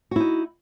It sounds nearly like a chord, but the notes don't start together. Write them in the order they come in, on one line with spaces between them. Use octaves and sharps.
F#4 E4 D#4